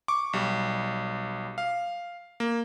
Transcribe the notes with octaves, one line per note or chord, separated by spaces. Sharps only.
C#6 D6
B1 G3
F5
A#3